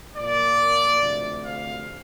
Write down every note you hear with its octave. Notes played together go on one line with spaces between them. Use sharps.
A#2 F3 A#3 D5
D2 C3 F3
F5